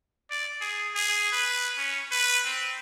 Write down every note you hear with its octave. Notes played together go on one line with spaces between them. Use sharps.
D5
G#4
G#4
B4
C#4
B4
C4